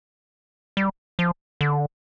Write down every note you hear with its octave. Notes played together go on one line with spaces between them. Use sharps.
G3
F3
D3